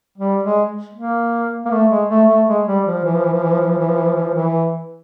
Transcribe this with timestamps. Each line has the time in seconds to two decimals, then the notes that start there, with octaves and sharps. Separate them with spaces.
0.18 G3
0.43 G#3
0.94 A#3
1.65 A#3
1.71 A3
1.90 G#3
2.10 A3
2.28 A3
2.48 G#3
2.67 G3
2.86 F3
3.04 E3
3.15 F3
3.24 E3
3.33 F3
3.42 E3
3.51 F3
3.61 E3
3.69 F3
3.78 E3
3.88 F3
3.98 E3
4.07 F3
4.16 E3
4.24 F3
4.34 E3